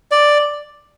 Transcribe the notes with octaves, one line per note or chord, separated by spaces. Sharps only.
D5